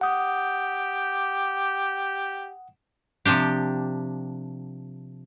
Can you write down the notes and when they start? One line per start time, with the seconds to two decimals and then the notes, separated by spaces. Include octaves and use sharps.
0.01 G4 F#5 D#6
3.25 C3 F3 D4 G4